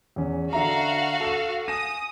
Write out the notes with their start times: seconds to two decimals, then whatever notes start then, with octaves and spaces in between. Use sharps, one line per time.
0.16 E2 C#4
0.53 D3 F#4 E5 F5 A#5
1.21 A4 E7
1.68 G#5 D#6 A#6 E7